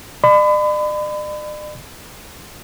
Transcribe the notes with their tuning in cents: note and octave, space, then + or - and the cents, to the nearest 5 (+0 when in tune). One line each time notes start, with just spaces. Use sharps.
D5 +45 B5 +35